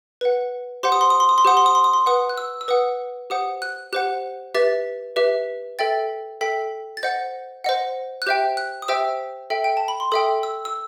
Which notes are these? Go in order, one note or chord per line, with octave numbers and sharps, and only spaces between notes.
B4 F#5
G4 C5 F#5 C6
D#6
C6
D#6
C6
D#6
C6
G4 C5 F#5 D#6
C6
D#6
C6
D#6
C6
B4 F#5 D#6
F#6
E6
E6
B4 F#5 D#6
G4 C5 F#5 D#6
F#6
G4 C5 F#5 F#6
G4 B4 E5 A6
G4 B4 E5
A4 E5 G5 A6
A4 E5 G5 B6
A6
C5 D#5 F#5 G6
C5 D#5 F#5
F#6
G4 C5 E5 G5 G6
F#6
D#6
G4 C5 E5 G5 E6
A4 E5 G5
G5
A5
B5
C6
A4 E5 G5 D#6
E6
E6